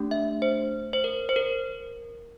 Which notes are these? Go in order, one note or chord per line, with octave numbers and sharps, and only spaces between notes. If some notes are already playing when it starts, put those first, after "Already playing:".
Already playing: A3 D4 G4
E5
C5
C5
A#4
C5
A#4